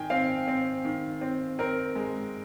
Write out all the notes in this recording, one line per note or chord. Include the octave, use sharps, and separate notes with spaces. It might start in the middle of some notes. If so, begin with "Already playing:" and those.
Already playing: D#3 G5 G#5
C4 F5
C4
D#3
C4
C4 A#4
G#3